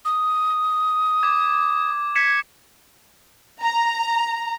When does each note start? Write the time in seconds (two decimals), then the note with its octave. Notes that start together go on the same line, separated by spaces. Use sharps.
0.05 D#6
1.23 D6 G#6
2.15 G#6 B6 C#7 E7
3.62 A#5